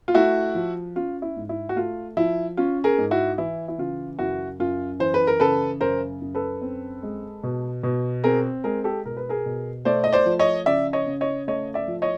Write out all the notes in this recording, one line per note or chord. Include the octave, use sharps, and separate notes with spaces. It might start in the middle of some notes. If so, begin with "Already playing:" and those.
F4
A3 E4 F#4
F3
C#4 F4
E4
G#2
E4
F#4
A3 F4
F3 E4
C#4 F4
G#4 A#4
G#2
E4 F#4
E3 E4
E4
C#3 F4
F#2 E4 F#4
F#2 F4
E3 C5
B4
A#4
C#3 A4 B4
F#2 A#4 C5
F#2
A4 B4
C4
G#3
B2
B2
C4 G#4 A#4
G#3 G#4 A#4
G4 A4
B2 A#4
B4
G#4 A#4
B2
A3 C5 D5
D#5
C5 D5
F3
C#5 D#5
C#3 D5 E5
C#5 D#5
C#3
C#5 D#5
A3 C#5 D#5
D5 E5
F3
C#5 D#5